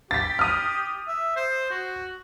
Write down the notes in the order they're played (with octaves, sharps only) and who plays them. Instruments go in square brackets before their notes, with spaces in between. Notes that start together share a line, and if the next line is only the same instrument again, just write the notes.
[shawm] G4 [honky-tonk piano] A6 B6
[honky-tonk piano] D#6 F6
[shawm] E5
C5
F#4